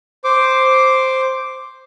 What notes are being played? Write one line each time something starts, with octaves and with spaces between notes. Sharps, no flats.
C5 D6